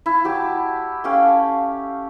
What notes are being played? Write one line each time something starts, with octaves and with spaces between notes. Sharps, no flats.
E4
F#3 G4 A5
A3 C#4 G4 F5